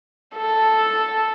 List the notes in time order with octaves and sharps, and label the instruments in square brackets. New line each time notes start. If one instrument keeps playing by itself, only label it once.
[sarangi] A4